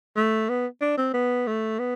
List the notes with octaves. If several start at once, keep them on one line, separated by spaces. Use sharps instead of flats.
A3
B3
D4
C4
B3
A3
B3